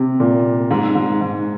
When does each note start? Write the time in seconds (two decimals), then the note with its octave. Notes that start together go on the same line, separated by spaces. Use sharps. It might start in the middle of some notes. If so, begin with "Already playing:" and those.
Already playing: C3
0.20 A#2
0.71 G#2
0.95 G#2
1.21 G#2